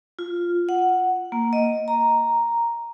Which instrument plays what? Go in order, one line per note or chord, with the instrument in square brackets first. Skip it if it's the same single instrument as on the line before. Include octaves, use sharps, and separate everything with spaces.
[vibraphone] F4
F#5
A#3
D#5
A#5